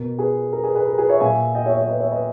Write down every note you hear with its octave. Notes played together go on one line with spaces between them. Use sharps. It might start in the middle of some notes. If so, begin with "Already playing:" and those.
Already playing: B2 A#4
G#4 B4
A#4
G#4 B4
G#4 B4
A#4
G#4 B4
C#5 E5
A#2 E5 G#5
D#5 G5
C#5 E5
C#5 E5
B4 D#5
C#5 E5
B4 D#5